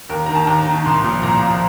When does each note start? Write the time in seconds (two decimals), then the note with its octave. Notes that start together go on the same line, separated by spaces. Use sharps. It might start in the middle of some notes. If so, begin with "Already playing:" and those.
0.09 D#2 A#4
0.26 D#3 A#5
0.35 A5
0.47 D#2 A#5
0.67 D#3
0.86 C2 C6
1.04 A#2 F3
1.23 C2 A#5
1.43 A#2 F3